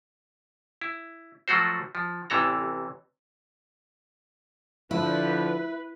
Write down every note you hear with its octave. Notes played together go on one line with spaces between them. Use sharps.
E4
F3 F#3 A3 F#4 C5
F3
A1 C3 E3 A4 A#5
D3 F3 E4 B4